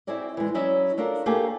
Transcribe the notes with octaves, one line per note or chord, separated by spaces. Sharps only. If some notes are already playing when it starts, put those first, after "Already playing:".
C4 E4 F#4 G#4 D5 D#5
E3 G#3
F#3 C#4 E4 D5 D#5
A3 D4 F4 A#4
A3 A#3 G4 G#4 A#4